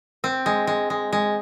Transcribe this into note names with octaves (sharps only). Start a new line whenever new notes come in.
C4
G#3
G#3
G#3
G#3